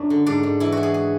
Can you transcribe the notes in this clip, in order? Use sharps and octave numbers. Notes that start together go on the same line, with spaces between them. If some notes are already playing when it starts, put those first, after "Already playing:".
Already playing: F#2 D4
D3
G#2 D4
G#2
E3 E4
E3 F#4
G#4
G#4